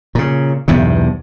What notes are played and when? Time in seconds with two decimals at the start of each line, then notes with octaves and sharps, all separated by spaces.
0.15 A#2 C#3
0.68 B1 E2 G2 C3